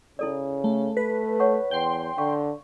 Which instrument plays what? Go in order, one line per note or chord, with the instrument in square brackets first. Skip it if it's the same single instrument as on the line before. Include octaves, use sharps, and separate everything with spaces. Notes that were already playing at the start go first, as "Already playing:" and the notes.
[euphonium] C#3 [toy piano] E4 A4 D5
[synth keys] A3
[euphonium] A3 [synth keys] B4
[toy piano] C#5 F#5 C#6
[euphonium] E2 [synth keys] G5 C6
[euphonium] D3 [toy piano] F5 C#6